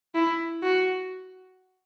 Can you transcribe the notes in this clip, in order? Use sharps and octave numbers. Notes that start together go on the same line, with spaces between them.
E4
F#4